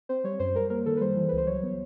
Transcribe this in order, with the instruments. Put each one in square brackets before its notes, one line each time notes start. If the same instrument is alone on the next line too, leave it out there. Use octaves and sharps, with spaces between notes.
[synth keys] C4 C5
G3 C#5
F#2 C5
G3 A#4
A#3 A#4
D#3 A4
B4
G3 C5
E3
C#2 B4
C5
F#3 C#5
B3